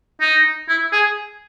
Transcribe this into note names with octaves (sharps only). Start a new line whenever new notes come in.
D#4
E4
G#4